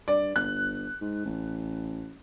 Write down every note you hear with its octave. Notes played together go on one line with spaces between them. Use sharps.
G2 D5
G1 F#6
G#2
A1